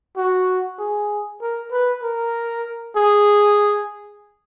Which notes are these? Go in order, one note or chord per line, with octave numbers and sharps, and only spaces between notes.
F#4
G#4
A#4
B4
A#4
G#4